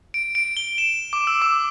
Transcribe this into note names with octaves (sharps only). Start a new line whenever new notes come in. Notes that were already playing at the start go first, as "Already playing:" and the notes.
D7
D7
G7
E7
D6
E6
D6